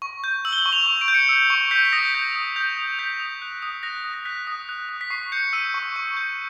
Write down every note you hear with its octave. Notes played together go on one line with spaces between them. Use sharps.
C#6
G6
E6 F#7
G7
F#7
C#6
F7
C#6
D7
G6
C#7
E6
C#6
G6 B6
B6
D#6 A#6
G6
D#6
G6
D#6
G6 B6
D#6
F#6
D#6
F#6 A#6
D#6
A#6
F#6 B6
D#6
F#6
D#6
B6
C#6 C7
G6 C#7
E6 D#7
C#6
C#6
G6